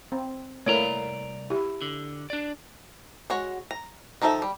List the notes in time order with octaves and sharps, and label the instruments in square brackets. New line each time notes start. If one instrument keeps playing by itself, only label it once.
[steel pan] C4
[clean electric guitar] C2 D5 A#5 [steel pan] A3 A#3 E4 [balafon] C#5
[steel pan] E4 [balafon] G4
[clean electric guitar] D3
D4 D5
[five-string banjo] G#3 F#4 C#5 F#5
A#5
D#3 F3 D#4 A4 E5
G3